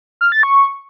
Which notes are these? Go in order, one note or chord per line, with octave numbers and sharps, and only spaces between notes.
F6
A6
C#6